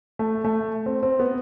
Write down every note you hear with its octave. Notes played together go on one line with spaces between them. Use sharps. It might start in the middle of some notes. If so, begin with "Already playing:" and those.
A3
A3
C4
C4
B3